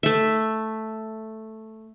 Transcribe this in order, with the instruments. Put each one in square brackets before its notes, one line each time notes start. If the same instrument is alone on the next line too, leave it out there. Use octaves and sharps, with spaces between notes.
[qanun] A3 E5